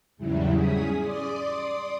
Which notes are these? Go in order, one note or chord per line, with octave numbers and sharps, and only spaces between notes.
E2 G#2 C#3 F#3 G3 E4
C#4 G#4 D#6 B6
D5 C6 D6 D#6